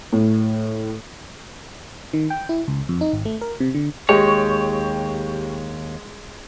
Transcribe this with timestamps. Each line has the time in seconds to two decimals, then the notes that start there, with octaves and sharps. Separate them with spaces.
0.13 A2
2.13 D#3
2.30 G5
2.49 E4
2.68 C#2
2.89 F2
3.01 D#4
3.13 G#1
3.25 A3
3.41 A#4
3.60 C3
3.75 D3
4.09 D#2 G#3 G4 C#5 C#6